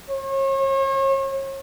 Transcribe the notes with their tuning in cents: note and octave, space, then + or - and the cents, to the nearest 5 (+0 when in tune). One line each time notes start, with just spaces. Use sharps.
C#5 -40